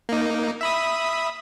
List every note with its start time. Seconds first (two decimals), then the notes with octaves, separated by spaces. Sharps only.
0.09 A#3 D#4
0.61 E5 B5 D#6